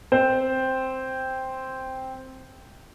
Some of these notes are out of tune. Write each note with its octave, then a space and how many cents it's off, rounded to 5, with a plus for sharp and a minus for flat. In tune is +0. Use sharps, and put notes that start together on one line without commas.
C4 +0 C5 +0